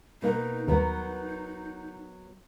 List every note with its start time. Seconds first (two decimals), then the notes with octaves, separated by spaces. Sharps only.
0.22 B2 A#3 D#4
0.68 D#2 F#3 B3 D#4 A#4